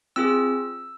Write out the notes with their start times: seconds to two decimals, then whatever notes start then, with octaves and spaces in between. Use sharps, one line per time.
0.16 C4 F4 G#4 E6